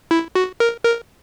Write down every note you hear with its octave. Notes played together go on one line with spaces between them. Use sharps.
E4
F#4
A#4
A#4